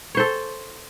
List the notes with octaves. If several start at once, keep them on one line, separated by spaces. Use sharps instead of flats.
A4 C5 C#5